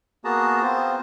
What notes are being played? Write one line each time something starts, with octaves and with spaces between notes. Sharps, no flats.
A#3 B3 F#4 G#4 A5 A#5
B3 C4 F4 C5